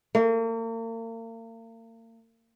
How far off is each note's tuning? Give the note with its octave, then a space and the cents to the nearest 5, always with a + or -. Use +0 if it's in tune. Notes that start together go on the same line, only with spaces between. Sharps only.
A#3 -40